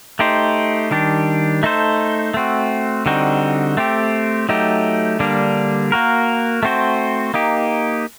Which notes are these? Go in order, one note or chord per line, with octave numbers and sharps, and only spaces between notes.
A3 D#4 G4 C5
D#3 G3 D4 G4
A3 D#4 A4 C5
A3 C4 F#4
D3 G3 C4 D#4 F#4
A3 C4 G4
F#3 A3 D#4 G4
D3 G3 A#3 D4
A#3 F#4 A#4
A3 C4 F#4 C5
A#3 D#4 G4